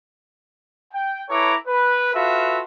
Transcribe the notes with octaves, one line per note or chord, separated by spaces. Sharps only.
G5
E4 A4 B4 C#5 A#5 D6
B4
F4 F#4 A4 B4 E5 F5